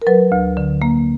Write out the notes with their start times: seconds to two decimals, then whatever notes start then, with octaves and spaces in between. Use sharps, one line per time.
0.02 A#4
0.07 F#3 B4
0.32 D2
0.57 D3
0.82 A#3